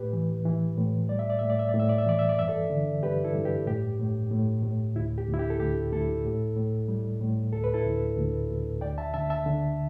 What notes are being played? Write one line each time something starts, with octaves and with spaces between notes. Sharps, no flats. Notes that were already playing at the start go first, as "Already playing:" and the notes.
Already playing: A2 G4 B4
E3
E3
A2
G3 D5
E5
D5
A2 E5
D5
E5
A2 D5
E5
D5
E5
E3 D5
E5
D5
G2 E5
A4 D5
D3
G2 G4 B4
E4 A4
G2
G4
A2 G4
A2
A2
A2
D2 E4
G4
D2
E4
G4
A4
D2 G4
D2 E4 A4
A2
A2
G3
A2
D2 A4
B4
E4 A4
D2
D2
D2
D2 D5 G5
E5 A5
D3 E5 A5
E5 A5
D3